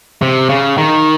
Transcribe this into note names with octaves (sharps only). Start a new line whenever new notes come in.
C3
C#3
D#3